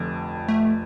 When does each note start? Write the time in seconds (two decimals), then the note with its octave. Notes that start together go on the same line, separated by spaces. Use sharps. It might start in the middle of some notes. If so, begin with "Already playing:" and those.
Already playing: F1 F2 D3
0.48 A3